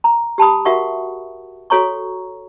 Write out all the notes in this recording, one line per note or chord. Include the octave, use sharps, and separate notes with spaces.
A#5
G4 A5 B5 D#6
F#4 A#4 E5 F#5 C#6
F#4 A4 C#5 A#5 C#6